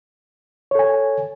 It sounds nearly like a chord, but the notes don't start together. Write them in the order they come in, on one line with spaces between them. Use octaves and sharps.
C#5 A4 G#5